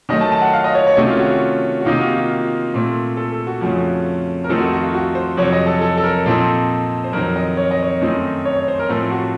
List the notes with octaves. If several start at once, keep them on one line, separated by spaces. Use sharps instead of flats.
D#3 F#3 A3 D#5
A5
A5
F#5
F5
D#5
C#5
C#5
C3 D#3 A3 C#4 F#4
F4
F#4
F#4
F#4
C3 D#3 A#3 D#4 F4
F#4
F4
F4
A#2 A3 C4
A4
A4
F#4
F2 C#3 F3 A3 C#4 F#4
A#4
F2 D#3 A3 C4 D#4 A4
F#4
F#4
F4
F#4
C5
F2 C3 F#3 C#5
D#5
A4
A4
A4
A#4
A#2 F3 C4 D#4 A4
C5
F2 D#3 F#3 A#4
D#5
C#5
D#5
C#5
F#2 D#3 A3 C4 D#4
C#5
C#5
C5
A#4
A2 F3 A3 C4 A4
F#4